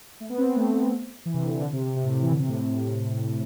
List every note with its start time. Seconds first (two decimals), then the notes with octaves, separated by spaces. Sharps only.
0.20 A3
0.30 B3
0.38 C4
0.47 B3
0.56 A3
1.26 E3
1.34 C3
1.43 D3
1.52 C3
1.61 D3
1.73 C3
1.84 C3
1.96 C3
2.04 A2
2.14 C3
2.22 E3
2.31 D3
2.39 C3
2.48 A2